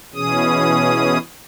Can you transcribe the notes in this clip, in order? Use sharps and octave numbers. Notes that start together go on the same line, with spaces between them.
B2 E3 C#4 G#4 D#6